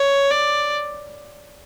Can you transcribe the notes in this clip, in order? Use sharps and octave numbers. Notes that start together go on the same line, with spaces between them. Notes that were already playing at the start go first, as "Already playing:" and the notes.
Already playing: C#5
D5